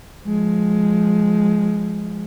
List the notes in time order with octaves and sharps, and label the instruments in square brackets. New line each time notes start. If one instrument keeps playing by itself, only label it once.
[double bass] F3 G#3